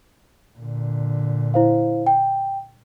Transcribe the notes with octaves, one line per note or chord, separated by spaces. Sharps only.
A#2 D3
E4 C5 F5
G5